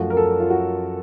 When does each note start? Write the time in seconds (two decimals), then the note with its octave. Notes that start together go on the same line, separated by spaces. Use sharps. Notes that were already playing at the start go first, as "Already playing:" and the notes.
Already playing: F#2 F3 A3 F#4
0.10 A#4
0.17 A4
0.40 F4
0.50 F#4